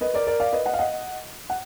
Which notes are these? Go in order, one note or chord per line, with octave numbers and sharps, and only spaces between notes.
B4 D#5
A#4 D5
A#4 D5
D5 F5
B4 D#5
D#5 F#5
F5
D#5 F#5
F#5